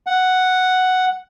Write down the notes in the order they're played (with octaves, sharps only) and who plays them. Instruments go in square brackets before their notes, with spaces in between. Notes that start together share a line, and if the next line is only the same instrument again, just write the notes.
[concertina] F#5